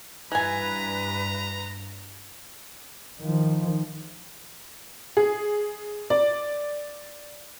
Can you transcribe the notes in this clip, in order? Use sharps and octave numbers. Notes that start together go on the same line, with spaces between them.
G2 E3 B4 G#5 A#5
D#3 F3
G#4
D5